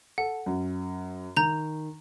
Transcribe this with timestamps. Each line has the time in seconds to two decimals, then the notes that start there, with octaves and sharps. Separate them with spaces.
0.18 A4 F#5
0.46 F#2
1.37 D#3 A#5 G6 F7